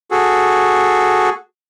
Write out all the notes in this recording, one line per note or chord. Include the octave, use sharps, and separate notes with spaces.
F#4 G#4 A4